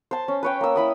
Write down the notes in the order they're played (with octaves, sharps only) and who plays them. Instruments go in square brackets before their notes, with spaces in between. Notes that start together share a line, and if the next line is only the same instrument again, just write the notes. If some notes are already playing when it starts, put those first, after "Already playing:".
[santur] C5 A5
C#4
B4 C#5 G5
A#3 E6
E4 B5 D#6